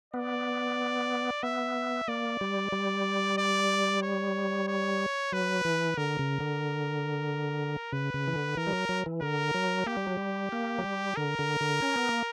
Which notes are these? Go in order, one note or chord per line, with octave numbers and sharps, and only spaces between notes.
B3 D5
B3 E5
A#3 D5
G3
G3
D5
C#5
C#5
F#3 B4
E3
D3 A#4
C#3
D3
C#3 B4
C#3
E3
D3
E3 A#4
G3
F#3
F#3
E3
D3 A#4
F#3
A#3 G4
G3
F#3
G3
A#3
F#3
G3
D3 A#4
D3
D3
C#4
B3
A#3